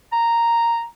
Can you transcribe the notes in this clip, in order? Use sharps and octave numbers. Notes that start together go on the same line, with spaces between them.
A#5